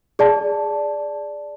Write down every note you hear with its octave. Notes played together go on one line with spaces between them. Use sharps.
G#4 D5 A5